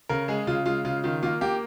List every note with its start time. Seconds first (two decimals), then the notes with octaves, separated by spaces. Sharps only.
0.09 C#3 A#4
0.28 G#3 G#4
0.47 C#3 F4
0.66 G#3 F4
0.85 C#3 F4
1.04 D#3 F4
1.23 A#3 F4
1.41 A#3 G4